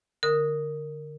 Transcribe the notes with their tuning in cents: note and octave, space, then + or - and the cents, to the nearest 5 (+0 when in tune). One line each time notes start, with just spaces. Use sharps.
D3 +0 A#4 -10 D#6 +0